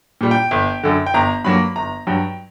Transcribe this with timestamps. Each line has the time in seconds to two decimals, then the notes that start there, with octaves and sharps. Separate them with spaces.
0.21 A#2 G3
0.31 G5
0.51 G1
0.83 F#2 D3
1.06 G5
1.14 G1 A#5
1.44 G2 F#3 A#3 B5
1.76 G1 A#5
2.07 G2 F#3 G5